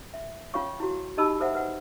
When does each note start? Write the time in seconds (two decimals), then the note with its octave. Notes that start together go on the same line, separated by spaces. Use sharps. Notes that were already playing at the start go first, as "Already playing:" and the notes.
0.14 E5
0.54 C#4 F4 C#5 F5 C#6
0.80 E4 F#4
1.17 D#4 G4 D#5 A5 B5 E6
1.40 A4 C5 E5 F#5
1.55 B4 F#5